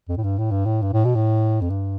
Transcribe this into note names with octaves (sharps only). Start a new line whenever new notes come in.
F2
A2
G2
A2
G2
A2
G2
A2
B2
A2
F2
G2